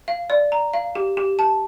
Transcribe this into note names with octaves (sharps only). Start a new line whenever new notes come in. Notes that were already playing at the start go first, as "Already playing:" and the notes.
F5
D5
A#5
F5
G4
G4
A5